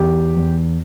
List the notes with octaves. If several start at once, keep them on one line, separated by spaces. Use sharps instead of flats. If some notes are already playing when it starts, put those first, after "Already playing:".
Already playing: E2 G4
E2